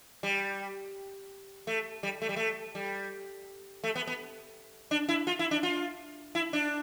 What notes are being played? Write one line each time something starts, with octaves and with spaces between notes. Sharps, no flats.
G3
A3
G3
A3
G3
A3
G3
A3
B3
B3
D4
E4
F4
E4
D4
F4
E4
D4